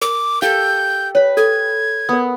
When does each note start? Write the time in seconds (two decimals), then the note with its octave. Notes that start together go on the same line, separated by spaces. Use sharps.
0.02 A#4 D6
0.42 G4 A4 F5 G6
1.15 B4 C#5 B5
1.37 A4 G#6
2.09 B3 A#4 D#6